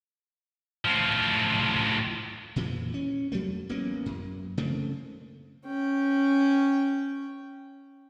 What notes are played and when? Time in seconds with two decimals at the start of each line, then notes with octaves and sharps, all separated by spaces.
0.85 A2 F3
2.56 F2 A#2 E3 F3
2.94 C#4
3.32 F2 F#3 A3 A#3
3.69 A1 A#3 B3 C#4
4.06 F#2
4.58 C#3 A3 A#3 C4
5.67 C#4 G5